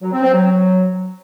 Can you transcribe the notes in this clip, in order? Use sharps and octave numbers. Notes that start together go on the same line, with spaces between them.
F#3
C4
C4
F#3